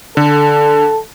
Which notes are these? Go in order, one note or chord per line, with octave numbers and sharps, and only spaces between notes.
D3 A4